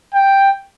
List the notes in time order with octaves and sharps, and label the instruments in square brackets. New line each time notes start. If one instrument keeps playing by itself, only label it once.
[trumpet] G5